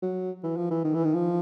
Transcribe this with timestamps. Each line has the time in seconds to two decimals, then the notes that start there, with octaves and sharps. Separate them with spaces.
0.02 F#3
0.44 E3
0.57 F3
0.70 E3
0.84 D#3
0.94 E3
1.05 D#3
1.15 F3